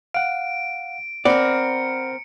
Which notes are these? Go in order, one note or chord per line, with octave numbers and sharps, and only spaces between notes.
F5 F#5 D7
C4 A#4 D5 F#5 B5 C#7